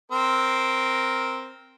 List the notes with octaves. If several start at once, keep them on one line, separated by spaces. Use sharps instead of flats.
C4 A#4